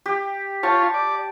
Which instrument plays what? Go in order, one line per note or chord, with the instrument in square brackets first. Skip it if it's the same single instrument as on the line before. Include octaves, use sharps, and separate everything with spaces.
[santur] G4
[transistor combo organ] F4 C#5 [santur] A5
[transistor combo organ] D5